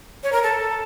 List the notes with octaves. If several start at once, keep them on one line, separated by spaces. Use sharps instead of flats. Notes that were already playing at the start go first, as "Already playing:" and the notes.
C#5
A#4
A4